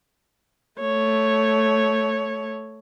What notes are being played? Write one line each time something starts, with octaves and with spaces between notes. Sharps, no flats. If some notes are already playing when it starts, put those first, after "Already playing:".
A3 C#5